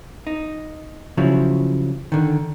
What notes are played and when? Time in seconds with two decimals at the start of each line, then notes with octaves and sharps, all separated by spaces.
0.27 D#4
1.17 C#3 F3 F#3 E4
2.12 D3 D#3